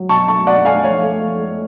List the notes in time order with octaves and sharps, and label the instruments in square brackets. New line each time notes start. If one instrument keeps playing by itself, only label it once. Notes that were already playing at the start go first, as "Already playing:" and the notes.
Already playing: [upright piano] F#3
B2 A5 C#6
A3 A5 C#6
B2 D5 F#5
A3 F5 G#5
F3 C#5 F5
A3
F3
A3